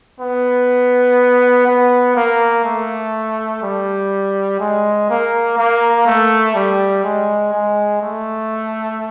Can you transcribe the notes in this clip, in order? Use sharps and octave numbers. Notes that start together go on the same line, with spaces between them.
B3
B3
A#3
A3
G3
G#3
A#3
A#3
A3
G3
G#3
G#3
A3